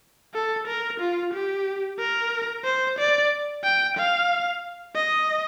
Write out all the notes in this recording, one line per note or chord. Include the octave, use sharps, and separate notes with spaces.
A4
A#4
F4
G4
A#4
C5
D5
G5
F5
D#5